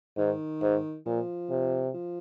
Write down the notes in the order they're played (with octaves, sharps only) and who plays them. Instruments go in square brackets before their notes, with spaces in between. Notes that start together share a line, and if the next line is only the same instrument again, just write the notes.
[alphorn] G#2 [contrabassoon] D#3
[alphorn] G#2
[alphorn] A#2 [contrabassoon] F3
[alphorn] C3
[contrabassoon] F3